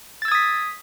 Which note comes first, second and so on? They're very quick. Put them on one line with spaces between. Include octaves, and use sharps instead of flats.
A6 E6 G#6 D#6 B6